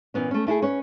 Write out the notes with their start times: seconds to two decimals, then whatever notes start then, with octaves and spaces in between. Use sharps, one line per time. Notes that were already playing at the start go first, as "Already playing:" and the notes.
0.14 A#2 E3 B3 C#4
0.31 A3 C#4
0.47 A3 E4 F#4 G#4
0.62 C#4 B4 C#5